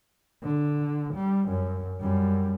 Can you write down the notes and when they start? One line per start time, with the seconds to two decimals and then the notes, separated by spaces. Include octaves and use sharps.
0.43 D3
1.14 G3
1.49 F#2
2.01 F#2 G3